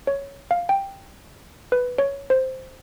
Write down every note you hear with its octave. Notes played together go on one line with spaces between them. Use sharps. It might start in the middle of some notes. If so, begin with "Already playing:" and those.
C#5
F5
G5
B4
C#5
C5